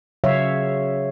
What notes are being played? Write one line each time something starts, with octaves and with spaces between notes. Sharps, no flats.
C#3 F#3 C#5 E5 F5